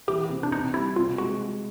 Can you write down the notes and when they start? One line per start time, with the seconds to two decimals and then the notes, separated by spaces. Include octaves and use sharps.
0.08 E3 G4
0.30 C3
0.43 D4
0.51 C3 D#4
0.74 G3 E4
0.96 C3 F4
1.18 G#3 F#4